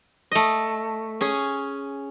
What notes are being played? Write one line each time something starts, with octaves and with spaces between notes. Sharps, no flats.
A3 D#5
C#4 G#4